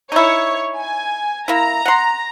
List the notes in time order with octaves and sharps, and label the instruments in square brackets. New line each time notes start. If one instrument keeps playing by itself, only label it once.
[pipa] D#4 E4 [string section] C#5
[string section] G#5
[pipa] A#3 E4 [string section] A#5
[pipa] F#5 C6